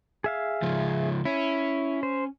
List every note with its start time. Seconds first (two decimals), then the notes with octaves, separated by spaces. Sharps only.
0.24 G#4 E5 F5
0.62 C#2 F3
1.25 C#4 E4
2.03 C5